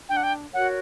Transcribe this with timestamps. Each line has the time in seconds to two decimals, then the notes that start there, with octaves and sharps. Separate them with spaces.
0.09 D4 G5
0.17 F#5
0.23 G5
0.54 F#4 A#4 C#5 F#5